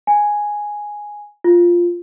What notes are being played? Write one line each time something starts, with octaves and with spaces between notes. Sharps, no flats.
G#5
F4